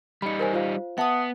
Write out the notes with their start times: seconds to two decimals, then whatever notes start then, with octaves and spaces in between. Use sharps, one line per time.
0.22 G3 D#4 B5 C#7
0.40 A#4 C5 G#5
0.54 F4 C5 F5
0.98 B3 E5 F#5 A5 D#6